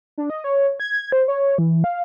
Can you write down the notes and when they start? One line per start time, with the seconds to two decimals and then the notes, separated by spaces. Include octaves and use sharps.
0.18 D4
0.30 D#5
0.44 C#5
0.80 G#6
1.12 C5
1.28 C#5
1.58 E3
1.84 F5